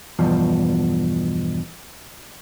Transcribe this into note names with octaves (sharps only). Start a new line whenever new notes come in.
E2 G2 B2 F3